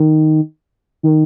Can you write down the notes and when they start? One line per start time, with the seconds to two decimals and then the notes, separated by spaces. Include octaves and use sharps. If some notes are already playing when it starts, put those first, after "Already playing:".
Already playing: D#3
1.03 D#3